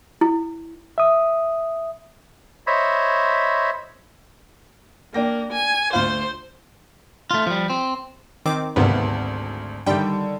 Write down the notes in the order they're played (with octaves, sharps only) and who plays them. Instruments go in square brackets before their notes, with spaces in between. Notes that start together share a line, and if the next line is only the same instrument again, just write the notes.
[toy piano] E4
[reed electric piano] E5 D#6
[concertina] C5 C#5 D#5 E5 B5
[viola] A#3 [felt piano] D4 G5 A#6
[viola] G#5
[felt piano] D2 F4 F5 [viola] C5
[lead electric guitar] A3 F4
F3 G3
C4
[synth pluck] D#3 C4 D6
[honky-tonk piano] G#1 D2 [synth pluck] C3 A#3 B3
[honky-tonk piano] D3 D#3 [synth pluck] G3 G5